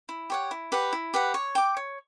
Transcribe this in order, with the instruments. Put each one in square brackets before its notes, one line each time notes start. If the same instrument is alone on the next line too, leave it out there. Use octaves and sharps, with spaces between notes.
[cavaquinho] E4
G4 C#5 F#5
E4
G4 B4 F#5
E4
G4 B4 F#5
C#5
G5 D6
C#5